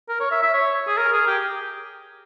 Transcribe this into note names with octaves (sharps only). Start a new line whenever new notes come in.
A#4
C#5
E5
E5
C#5
G#4
A#4
G#4
G4